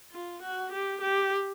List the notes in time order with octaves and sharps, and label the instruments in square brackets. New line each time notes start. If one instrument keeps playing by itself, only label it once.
[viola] F4
F#4
G4
G4